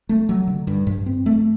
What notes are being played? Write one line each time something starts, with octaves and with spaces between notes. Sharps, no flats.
A3
F#3
D3
G2
G2
C4
A3